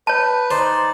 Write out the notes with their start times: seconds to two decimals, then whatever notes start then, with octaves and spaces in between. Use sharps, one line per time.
0.07 B4 C#5 A5
0.51 D#4 C5 D5